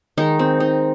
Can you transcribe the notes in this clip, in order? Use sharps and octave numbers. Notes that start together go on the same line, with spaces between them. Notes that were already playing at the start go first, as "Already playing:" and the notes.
D#3 G#3 D#4
C4
D#4